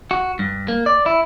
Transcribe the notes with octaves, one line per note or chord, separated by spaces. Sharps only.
F#4
G2
A#3
D5
E4